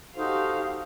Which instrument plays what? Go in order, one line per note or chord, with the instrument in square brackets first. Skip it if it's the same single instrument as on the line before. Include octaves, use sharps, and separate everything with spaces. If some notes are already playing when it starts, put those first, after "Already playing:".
[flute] D#4 [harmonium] F#4 A4 C5 [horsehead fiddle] G4 F5